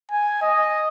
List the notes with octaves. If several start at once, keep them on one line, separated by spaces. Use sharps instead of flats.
G#5
D#5